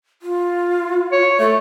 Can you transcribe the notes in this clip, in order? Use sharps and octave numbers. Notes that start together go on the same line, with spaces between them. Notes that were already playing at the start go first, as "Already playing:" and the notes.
F4
C#5
A3 A4